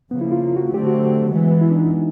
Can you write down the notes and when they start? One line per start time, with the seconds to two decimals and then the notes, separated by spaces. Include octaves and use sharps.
0.11 C#3 F3 A#3 B3
0.21 E4
0.32 F4
0.56 F#4
0.72 D3 F#3 A3 C4 G4
0.86 F#4
1.30 E3 G#3 B3
1.61 E4
1.71 D4
1.76 D#4